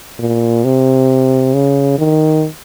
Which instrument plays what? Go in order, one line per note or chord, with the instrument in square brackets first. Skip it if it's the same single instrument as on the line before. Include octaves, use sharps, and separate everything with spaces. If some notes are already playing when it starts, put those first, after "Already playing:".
[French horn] A#2
C3
C#3
D#3